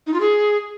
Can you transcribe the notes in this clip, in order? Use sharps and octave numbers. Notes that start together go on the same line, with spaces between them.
D#4
F4
G#4